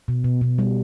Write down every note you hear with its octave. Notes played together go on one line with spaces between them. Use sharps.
B2
B2
B2
G3